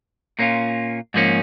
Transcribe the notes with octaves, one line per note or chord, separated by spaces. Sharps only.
A#2 A#3 C#4 F4
G#2 F3 A#3 C#4